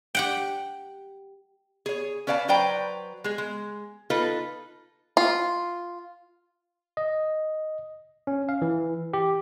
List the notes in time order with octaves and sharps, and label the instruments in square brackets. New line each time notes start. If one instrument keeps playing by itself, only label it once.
[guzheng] G4 F#5 G5
[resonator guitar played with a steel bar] G#4 C#5
C#4 B4 D5 F5 G5 A5
F#3 B4 C5 D5 G5 A#5
G#3 G#4
G#3
D#4 F4 A4 B4
[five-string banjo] F4
[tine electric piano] D#5
C#4
F5
E3
G4